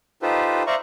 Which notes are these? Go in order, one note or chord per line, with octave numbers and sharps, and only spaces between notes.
D#4 F4 G4 A4 B4 C5
C5 D5 E5 F5 A#5 C#6